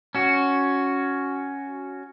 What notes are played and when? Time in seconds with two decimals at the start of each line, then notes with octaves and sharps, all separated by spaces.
0.15 C#4 F#4